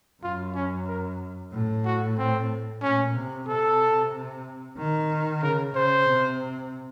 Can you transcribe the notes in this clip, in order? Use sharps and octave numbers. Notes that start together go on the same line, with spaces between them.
F#2 F4
C#4
A#4
A2
F#4
C4
A#2 C#4
C3
C3 A4
D#3
C#3 A#4
C#3 C5
C3